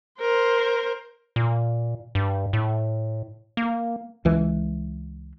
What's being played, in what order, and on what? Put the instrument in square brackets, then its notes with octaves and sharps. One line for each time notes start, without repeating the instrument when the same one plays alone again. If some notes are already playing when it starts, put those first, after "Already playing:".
[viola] A#4 C5
[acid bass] A#2
G2
A2
A#3
[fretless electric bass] C#2 E3 G#3